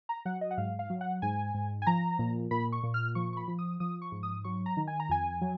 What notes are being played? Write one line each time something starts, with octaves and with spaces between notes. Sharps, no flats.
A#5
F#3 F#5
D#5
F#5
G#2 F5
F5
F#3
F#5
G#2 G#5
G#2
G#5
F3 A#5
A#2
A#2 B5
C#6
A#2
F6
F3 C#6
C#6
B5
F3
D#6
F3 D#6
C#6
G#2
D#6
F#3 C#6
A#5
D#3
G#5
A#5
F2 G#5
F#3